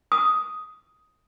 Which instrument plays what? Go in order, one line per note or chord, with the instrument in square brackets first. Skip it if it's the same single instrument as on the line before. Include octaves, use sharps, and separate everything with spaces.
[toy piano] D#6